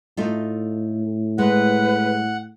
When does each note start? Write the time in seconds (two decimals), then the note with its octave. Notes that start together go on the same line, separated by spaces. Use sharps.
0.17 A2 A3 D#4 F4
1.38 G#3 B4 F#5